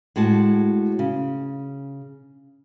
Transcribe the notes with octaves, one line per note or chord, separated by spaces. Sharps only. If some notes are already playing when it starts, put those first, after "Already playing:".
A2 G#3 F#4 A5
C#3